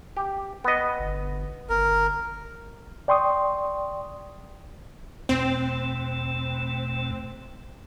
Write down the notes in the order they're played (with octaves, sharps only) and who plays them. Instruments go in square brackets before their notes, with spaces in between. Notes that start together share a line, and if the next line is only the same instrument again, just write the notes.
[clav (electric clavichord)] G4
B3 D#5
[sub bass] G1
[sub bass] G1 [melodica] A#4
[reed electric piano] D5 G5 C6 C#6 D#6
[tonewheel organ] E2 B2 A3 [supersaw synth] C4